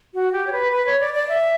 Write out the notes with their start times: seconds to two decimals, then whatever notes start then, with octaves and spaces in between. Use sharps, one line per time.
0.14 F#4
0.33 G4
0.47 C#5
0.52 B4
0.72 B4
0.86 C#5
1.00 D5
1.14 D5
1.29 E5